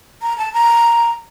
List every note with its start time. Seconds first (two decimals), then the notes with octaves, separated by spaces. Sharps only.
0.22 A#5
0.38 A5
0.53 A#5